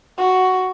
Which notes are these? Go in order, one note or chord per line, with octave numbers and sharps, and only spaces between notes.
F#4